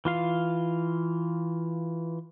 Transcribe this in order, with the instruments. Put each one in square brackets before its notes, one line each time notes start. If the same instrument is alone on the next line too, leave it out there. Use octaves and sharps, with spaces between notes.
[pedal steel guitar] E3 F4 F5